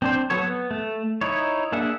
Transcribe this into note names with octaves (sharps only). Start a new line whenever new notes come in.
C4 D4 C5
F#3 B3 A4 C#5
B3
A3
D#4 E4 C#5
A#3 D4 G#4 E5 F#5